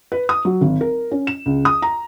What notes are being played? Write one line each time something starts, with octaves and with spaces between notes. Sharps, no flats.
B4
D#6
F#3
G#1
A#4
C#4
E7
C#2
D#6
A#5